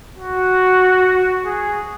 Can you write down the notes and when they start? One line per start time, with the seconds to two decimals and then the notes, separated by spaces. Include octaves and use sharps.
0.18 F#4
1.46 G#4